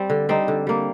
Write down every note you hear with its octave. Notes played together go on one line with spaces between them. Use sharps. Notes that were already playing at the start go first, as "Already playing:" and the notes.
Already playing: G3 C4
D3
G3 C4 D#4
D3
G3 A#3